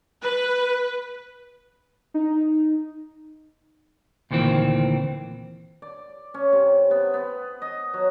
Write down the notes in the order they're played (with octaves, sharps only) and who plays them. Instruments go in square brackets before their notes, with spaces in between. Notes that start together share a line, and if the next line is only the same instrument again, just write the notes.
[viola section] B4
[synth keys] D#4
[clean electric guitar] D2 A#2 D#3 E3 C4
[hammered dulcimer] D5
C#4
C3
B3
B3
D#5
F#3